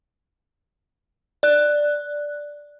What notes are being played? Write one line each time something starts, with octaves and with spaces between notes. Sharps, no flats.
D5 F#6